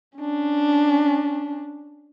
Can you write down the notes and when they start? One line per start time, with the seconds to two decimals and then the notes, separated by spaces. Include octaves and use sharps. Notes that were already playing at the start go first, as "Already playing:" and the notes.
0.18 C#4 D4